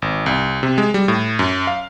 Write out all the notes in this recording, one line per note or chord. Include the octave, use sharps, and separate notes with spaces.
G#1
C2
C3
G#3
G3
A2
F#2
F5